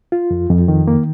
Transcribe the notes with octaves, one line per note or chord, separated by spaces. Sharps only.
F4
F2
F2
D#3
A#3